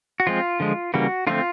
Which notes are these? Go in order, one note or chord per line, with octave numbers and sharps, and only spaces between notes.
F#4
F3 G#3 C4 F4
D3 F3 G#3
C#3 E3 G3 A#3 F#4
D3 F3 A3 C4 F4